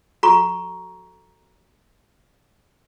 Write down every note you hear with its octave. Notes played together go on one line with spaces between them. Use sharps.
F#4 A4 A#5 C#6